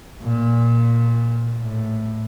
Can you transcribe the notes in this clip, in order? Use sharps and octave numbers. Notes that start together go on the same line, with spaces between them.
A#2
A2